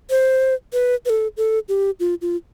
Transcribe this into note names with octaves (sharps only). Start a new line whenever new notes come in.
C5
B4
B4
A4
A4
G4
F4
F4